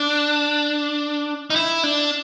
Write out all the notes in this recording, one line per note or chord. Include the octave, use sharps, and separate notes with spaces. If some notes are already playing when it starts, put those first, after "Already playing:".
Already playing: D4
D#4
E4
D4